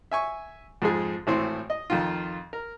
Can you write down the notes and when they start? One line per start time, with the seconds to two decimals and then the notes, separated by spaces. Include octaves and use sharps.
0.11 E5 G#5 C#6
0.82 F2 G#2 F3 G#4
1.27 G#1 A2 E3 C4 C5
1.70 D#5
1.90 F2 D#3 F4
2.53 A#4